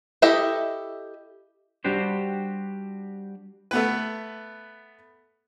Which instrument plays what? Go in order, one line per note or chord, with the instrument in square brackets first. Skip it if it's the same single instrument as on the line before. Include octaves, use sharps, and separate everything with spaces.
[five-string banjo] E4 G4 A4 D#5 E5
[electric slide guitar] G3 D4 F#4 G4 C5
[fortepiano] A3 B3 B4